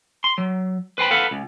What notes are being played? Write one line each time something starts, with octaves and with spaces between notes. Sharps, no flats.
C6
F#3
B4 C5 G5 B5
A4 B4 F5 F#5 B5
C#2